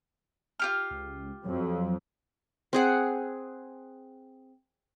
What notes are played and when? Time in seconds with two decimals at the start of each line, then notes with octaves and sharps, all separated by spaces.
0.60 F4 G4 F6
0.91 C#2
1.45 F2 F#3
2.73 C4 G#4 F#5